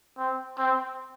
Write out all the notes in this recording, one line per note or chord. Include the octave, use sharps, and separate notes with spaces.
C4
C4